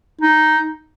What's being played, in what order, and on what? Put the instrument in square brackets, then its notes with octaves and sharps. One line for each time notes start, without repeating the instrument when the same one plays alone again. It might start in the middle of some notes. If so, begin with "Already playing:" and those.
[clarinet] D#4